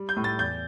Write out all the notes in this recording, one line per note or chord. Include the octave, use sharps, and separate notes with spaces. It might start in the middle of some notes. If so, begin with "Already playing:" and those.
Already playing: G3
G6
A2
A6
E2 G6